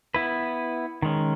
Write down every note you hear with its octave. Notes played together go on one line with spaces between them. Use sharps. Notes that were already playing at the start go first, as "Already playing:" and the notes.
B3 E4 B4
D#3 G#3 C#4